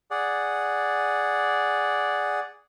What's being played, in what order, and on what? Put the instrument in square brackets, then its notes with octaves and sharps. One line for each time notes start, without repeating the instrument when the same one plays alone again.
[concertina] G#4 D5 F#5